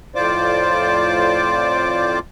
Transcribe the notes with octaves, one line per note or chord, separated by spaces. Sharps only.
F2 A2 F4 C5 D5 D6